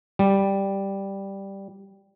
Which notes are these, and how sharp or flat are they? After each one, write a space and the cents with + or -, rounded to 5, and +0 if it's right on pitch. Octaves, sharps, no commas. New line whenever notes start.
G3 +0